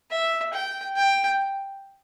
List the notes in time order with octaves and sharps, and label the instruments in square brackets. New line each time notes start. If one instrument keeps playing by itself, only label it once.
[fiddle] E5
G5
G5